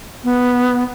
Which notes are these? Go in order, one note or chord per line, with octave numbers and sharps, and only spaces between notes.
B3